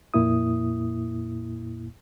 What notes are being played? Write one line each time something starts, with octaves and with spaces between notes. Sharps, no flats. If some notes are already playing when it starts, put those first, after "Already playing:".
F2 A#2 A#3 E4 D#6